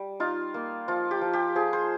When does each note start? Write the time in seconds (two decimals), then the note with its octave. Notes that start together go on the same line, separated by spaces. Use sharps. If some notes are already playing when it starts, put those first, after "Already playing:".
Already playing: G3
0.20 D#4 F4
0.54 A#3
0.88 F3 F4
1.11 G4
1.21 F3
1.33 G4
1.55 F3 G#4
1.73 C5